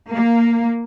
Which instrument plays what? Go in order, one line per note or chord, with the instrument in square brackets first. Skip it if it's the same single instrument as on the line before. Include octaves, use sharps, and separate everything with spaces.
[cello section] A#3